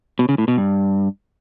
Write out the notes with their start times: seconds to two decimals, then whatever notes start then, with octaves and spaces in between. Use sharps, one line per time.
0.19 B2
0.29 C#3
0.38 A2
0.48 B2
0.57 G2